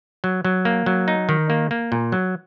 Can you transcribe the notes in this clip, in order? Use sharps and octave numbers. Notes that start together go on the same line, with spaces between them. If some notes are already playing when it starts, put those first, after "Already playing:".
F#3
F#3
A#3
F#3
D#4
D#3
A#3
A#3
A#2
F#3